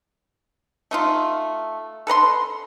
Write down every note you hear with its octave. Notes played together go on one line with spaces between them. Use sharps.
A3 D#4 F4
A4 B4 A#5 C6